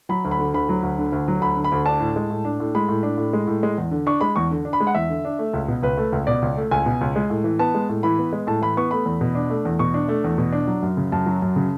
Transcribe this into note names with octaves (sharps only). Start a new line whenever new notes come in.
F#3 B5
D2
B5
D3
D2 B5
F#3
D2
D3
D2
F#3
D2 B5
D3
B5
D2
D4 A5
A2
G#3
A2
D4
A2
G#3 B5
A2
D4
A2
G#3
A2
G#3
E2
D3
D4 C#6
G#3 B5
E2 C#6
D3
D4
B5
G#3
F#5
E2 E5
D3
D4
A3
C#2
B2
C#2 B4
A3
C#2
B2 D5
C#2
A3
C#2 G#5
B2
C#2
G#3
A2
E3
B3 A5
G#3
A2
E3 B5
B3
G#3
A2 A5
E3 B5
B3 C#6
A3 B5
E2
B2
D4
A3
E2
B2 C#6
D4
A3
E2
B2
D4
F#3
F#2
C#3
F#2 A5
F#3
F#2
C#3